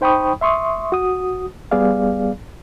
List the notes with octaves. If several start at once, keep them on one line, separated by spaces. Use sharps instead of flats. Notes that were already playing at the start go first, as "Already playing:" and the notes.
D#4 C5 G5 B5 C#6 D#6
E5 C6 C#6 D#6
F#4 D#6
G3 B3 G#4 D5 F5